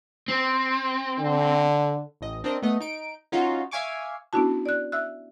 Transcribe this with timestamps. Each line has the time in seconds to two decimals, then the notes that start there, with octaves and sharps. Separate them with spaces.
0.28 C4
1.19 D3
2.21 A1 D#5
2.44 C4 D4 A#4 C5 D#5
2.62 A3 B3 D#5
2.80 D#4 D7
3.32 C#4 D#4 F4 F#4
3.71 E5 F5 G#5 C#6 D6
4.33 B3 C#4 D4 E4 F#4 A5
4.66 D5 F#6
4.92 E5 E6 F#6